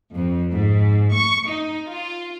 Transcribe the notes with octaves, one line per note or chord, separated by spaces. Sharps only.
F2
G#2
C#6
D#4
F4